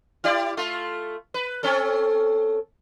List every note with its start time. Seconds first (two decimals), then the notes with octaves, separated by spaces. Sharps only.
0.24 E4 G4 D5
0.57 A3 F4
1.34 B4
1.63 C4 C#4 A4